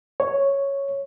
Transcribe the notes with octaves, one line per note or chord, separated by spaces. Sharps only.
C#5